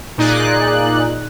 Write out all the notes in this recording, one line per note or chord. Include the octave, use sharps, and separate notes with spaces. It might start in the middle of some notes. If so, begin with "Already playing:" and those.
A#2 D#4 G#4 D5 F#6